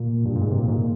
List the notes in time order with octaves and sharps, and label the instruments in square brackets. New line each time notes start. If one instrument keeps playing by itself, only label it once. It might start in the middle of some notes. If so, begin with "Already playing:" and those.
Already playing: [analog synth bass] A#2
G2
A#2
G#2
C3
A#2
G#2
A#2